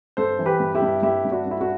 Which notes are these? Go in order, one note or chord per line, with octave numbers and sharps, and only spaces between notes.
G2 A4 C5
E3
G4 B4
G2
E4 G4
G2
G2 E4 G4
G2
D4 F#4
G2
E4
D4 F#4